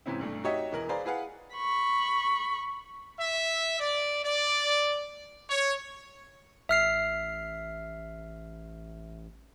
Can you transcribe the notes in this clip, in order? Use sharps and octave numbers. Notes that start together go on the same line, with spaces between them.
G#2 C3 E3 C4 C#4 E4
B1 G2 A3
D#4 F#4 G4 C#5 D#5 E5
E1 E3 A#4 F#7
G#4 B4 C5 D5 F5 A#5
E4 G#4 B4 F5 F#5
B5 C#6
E5
D5
D5
C#5
A1 E5 F6 C7